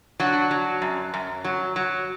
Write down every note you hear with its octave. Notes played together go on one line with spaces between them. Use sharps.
F#3 D4 F#4
F#3
F#2
F#2
F#3
F#3